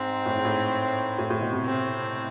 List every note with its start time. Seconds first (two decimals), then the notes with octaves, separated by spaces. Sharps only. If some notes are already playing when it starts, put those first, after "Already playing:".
Already playing: G#2 C4
0.26 A2
0.35 G#2
0.45 A2
1.18 A2
1.30 A2
1.41 B2
1.53 C3
1.65 C4